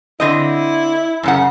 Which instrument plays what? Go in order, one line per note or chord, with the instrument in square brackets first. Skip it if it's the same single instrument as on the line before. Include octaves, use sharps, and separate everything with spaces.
[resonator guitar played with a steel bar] D3 C4 D#5 [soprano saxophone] E4
[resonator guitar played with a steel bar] F#2 C#3 F#5